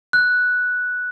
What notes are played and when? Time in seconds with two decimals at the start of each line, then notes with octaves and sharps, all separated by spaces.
0.13 F#6